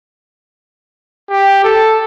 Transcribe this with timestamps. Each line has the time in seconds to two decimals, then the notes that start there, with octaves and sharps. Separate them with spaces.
1.30 G4
1.64 A4